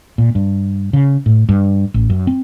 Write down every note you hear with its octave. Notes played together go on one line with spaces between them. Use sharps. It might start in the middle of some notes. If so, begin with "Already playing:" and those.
A#2
G2
C#3
A2
G2
A1
F#2
C4